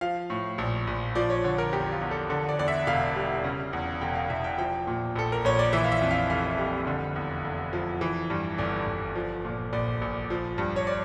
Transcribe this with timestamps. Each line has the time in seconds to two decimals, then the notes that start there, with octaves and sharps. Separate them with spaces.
0.01 F3 F5
0.30 A2
0.58 A#1
0.87 A#1
1.15 F3 D5
1.30 C#5
1.44 D3 C#5
1.58 A#4
1.73 E2 G4
1.92 F4
2.01 E2
2.11 A4
2.30 D3 A4
2.49 D5
2.59 E2 D5
2.68 E5
2.87 E1 F5
3.16 G3
3.44 C#3
3.73 E2
4.01 E1 G5
4.15 F5
4.30 E1 E5
4.44 G5
4.58 F3 G5
4.87 A#2
5.15 A#1 A4
5.32 A#4
5.45 A#1 C#5
5.59 D5
5.73 E3 E5
5.84 F5
5.92 E5
6.01 F2
6.11 F5
6.30 F1 F5
6.58 G3
6.87 D3
7.16 E2
7.44 F1
7.73 F3
8.01 E3
8.30 G2
8.58 G1 D5
8.87 G1
9.15 F3
9.45 A#2
9.73 A#1 D5
10.01 A#1
10.30 F3
10.58 G2
10.76 C#5
10.87 D5